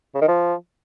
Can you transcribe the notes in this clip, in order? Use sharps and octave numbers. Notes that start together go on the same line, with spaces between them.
C#3
D#3
F3